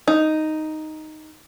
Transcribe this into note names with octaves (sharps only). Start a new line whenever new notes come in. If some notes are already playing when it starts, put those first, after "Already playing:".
D#4